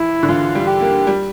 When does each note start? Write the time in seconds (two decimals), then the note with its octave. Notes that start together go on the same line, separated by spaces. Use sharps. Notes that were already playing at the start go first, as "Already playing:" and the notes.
Already playing: E3 E4
0.23 D3
0.29 E3 F4
0.55 G3
0.67 G4
0.81 A#3
1.07 G3